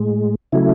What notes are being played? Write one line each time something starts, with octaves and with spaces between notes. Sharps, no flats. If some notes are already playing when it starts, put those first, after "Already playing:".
Already playing: A2 G#3
C#3 F#3 A3 E4